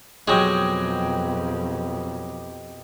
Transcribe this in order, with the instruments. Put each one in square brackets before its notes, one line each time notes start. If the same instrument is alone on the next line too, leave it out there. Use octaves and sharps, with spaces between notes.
[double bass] F2 B2 [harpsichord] F#3 G#3 [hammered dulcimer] G4 D#5 G5